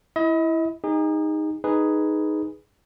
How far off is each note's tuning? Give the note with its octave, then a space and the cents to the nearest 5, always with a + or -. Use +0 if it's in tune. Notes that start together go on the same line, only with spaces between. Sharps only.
E4 +0 D#5 +40
D#4 +0 G#4 -35
D#4 +0 G#4 +0 B4 +0